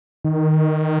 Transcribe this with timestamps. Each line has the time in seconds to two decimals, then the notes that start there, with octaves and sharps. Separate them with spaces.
0.24 D#3